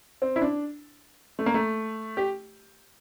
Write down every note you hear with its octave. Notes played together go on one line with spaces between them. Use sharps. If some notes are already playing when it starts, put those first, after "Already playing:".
C4
E4
D4
A3
A#3
A3
G4